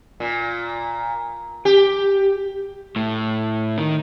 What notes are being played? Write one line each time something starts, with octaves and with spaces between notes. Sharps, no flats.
A#2
G4
A2
D#3